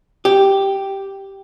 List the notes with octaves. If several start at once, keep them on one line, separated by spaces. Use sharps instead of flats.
G4